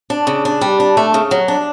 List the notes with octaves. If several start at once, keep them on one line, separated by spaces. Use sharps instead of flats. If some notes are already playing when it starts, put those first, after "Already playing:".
D4
C#3
D4
G3
D4
A3
C#3
F#3
D4